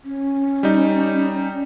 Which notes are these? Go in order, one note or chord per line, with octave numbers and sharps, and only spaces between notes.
C#4
G3 D#4